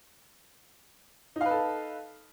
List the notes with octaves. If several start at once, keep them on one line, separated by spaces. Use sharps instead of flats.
D#4 A4 B4 F5